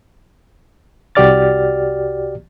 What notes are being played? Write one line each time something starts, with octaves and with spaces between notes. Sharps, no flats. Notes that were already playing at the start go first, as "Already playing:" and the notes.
C2 F#4 G4 D5 F6 A6